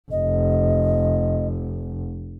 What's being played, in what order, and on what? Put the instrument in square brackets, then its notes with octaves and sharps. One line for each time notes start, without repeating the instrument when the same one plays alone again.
[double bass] F1 [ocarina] D#5